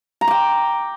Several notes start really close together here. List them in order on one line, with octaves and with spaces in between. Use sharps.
A#5 C6 D6 G5